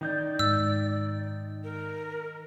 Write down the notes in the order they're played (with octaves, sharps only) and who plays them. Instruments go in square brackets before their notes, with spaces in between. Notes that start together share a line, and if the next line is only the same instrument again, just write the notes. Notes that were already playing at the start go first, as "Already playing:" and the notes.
[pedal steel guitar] D#3 D#4 G6 [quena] D5
[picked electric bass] G#2 [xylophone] E6
[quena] A#4